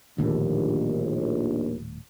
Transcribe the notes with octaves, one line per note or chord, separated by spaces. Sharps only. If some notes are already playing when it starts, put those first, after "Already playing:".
D#1 A#1 D#2 A2 D3